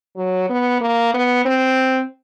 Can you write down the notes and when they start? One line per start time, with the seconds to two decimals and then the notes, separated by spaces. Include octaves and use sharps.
0.17 F#3
0.49 B3
0.81 A#3
1.14 B3
1.45 C4